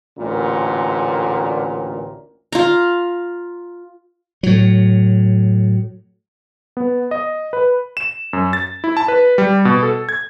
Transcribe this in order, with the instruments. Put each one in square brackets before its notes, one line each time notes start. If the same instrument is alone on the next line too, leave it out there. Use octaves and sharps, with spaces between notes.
[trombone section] A1 D2 A#2 A#4
[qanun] F4 A#5
[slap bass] A2 F#3
[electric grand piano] B3
D#5
B4
E7
F#2
A6
E4
A5
B4
G3
B2
A4
G#6